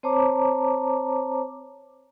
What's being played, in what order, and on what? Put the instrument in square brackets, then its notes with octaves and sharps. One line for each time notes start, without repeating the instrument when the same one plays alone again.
[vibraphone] C4 C5 C#5 A5 A#5 D6